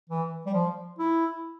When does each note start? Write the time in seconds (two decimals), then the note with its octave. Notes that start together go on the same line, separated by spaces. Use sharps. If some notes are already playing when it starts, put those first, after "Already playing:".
0.09 E3
0.46 G3
0.54 F3
0.98 E4